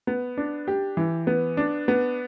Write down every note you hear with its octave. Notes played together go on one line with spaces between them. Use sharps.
B3
D4
G4
E3
B3
D4
B3